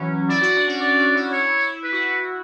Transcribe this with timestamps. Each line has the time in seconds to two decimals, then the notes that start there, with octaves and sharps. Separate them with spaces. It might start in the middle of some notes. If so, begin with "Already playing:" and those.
Already playing: E3 F#3 C#4
0.29 E4 D5
0.41 F#4
0.57 D4
0.68 C#4
0.81 D4 D5
0.98 C#4
1.15 E4
1.32 E4 C#5
1.58 E4
1.84 E4 B4
1.92 F#4
2.01 E4